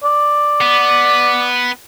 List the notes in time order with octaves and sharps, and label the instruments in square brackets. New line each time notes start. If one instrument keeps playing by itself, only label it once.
[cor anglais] D5
[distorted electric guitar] B3